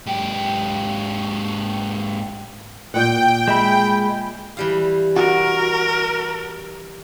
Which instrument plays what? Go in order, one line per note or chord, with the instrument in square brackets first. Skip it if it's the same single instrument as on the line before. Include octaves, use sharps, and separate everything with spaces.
[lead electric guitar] G#2 G4
[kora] A#2 F#5 [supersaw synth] G5
[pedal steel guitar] G#3 B5 [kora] E5
[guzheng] E3 G3 F5
[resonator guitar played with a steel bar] F#4 [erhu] A#4